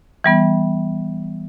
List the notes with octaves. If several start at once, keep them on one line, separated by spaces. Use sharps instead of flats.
E3 G3 B3